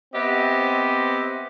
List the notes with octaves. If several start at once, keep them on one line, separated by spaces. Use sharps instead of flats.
B3 C4 G4 D#5 E5